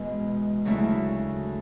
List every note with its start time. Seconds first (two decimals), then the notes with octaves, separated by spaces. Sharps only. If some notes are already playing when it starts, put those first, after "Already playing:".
Already playing: E2 B2 G#3
0.65 D2 C#3 F#3 A3 E4